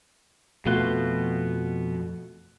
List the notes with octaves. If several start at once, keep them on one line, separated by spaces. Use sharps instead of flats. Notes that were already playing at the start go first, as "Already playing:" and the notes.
F2 B2 A3 F4 F#4 C6 F#6